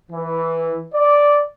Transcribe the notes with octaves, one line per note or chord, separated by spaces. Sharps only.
E3
D5